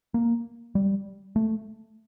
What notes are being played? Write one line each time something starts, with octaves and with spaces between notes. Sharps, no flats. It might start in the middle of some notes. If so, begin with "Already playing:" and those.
A#3
G3
A3